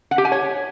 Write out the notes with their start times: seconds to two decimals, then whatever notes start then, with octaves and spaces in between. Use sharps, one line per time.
0.11 F#5
0.18 G4
0.25 G#5
0.32 C#5